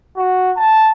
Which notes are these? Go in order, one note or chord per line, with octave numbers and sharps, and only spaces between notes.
F#4
A5